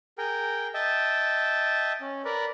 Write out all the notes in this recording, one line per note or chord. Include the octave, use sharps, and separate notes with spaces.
G#4 A#4 G5
D#5 E5 G5 A5
C#4
A#4 B4 D5